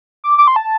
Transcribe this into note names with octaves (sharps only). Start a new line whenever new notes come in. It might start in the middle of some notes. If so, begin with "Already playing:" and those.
D6
D6
C6
A5